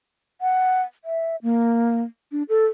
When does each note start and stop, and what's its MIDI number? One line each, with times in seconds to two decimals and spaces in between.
0.41 0.82 78
1.05 1.36 76
1.43 2.02 58
2.32 2.43 62
2.49 2.66 69